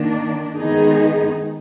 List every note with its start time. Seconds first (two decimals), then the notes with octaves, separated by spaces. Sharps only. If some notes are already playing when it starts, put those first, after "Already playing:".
Already playing: D#3 A#3 D4
0.57 D#3 G#3 B3 D#4 G#4